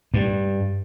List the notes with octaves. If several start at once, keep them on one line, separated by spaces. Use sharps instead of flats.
G2